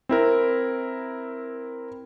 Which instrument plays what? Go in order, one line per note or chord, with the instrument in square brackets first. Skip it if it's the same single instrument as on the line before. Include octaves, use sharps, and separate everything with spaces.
[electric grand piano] C4 E4 A#4